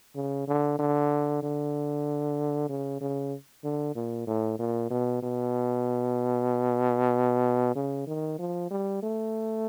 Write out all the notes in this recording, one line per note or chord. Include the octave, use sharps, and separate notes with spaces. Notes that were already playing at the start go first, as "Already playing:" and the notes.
C#3
D3
D3
D3
C#3
C#3
D3
A#2
A2
A#2
B2
B2
C#3
D#3
F3
G3
A3